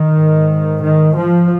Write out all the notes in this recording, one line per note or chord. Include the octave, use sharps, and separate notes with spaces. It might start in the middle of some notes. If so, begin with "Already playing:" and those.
Already playing: D#3
G#2
D#3
F3